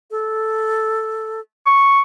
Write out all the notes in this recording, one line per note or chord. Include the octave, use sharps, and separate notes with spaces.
A4
C#6